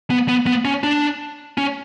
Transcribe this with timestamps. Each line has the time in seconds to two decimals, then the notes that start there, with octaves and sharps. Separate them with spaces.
0.10 B3
0.29 B3
0.47 B3
0.65 C#4
0.84 D4
1.58 C#4